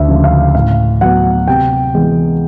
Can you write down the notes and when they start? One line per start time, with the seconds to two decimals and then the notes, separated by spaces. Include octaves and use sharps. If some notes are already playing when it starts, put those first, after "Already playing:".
Already playing: D2 E5
0.08 C#3 F3 G#3
0.24 F5
0.55 A2 F5
1.01 F#3 B3 F#5
1.47 C3 G5
1.94 E3 G#3 B3